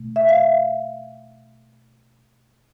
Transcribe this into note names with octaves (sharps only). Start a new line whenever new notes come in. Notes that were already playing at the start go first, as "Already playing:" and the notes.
Already playing: B2 A3
E5
F5
E5